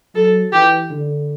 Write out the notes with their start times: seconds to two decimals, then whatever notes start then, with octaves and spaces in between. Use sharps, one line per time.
0.15 F#3 A4
0.53 E3 G4
0.90 D3